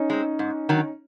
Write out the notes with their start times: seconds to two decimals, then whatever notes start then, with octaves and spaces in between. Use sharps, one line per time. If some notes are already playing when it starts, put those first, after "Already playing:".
Already playing: C#4 D#4
0.10 G#3 C4
0.39 G#2
0.69 D#3 F#3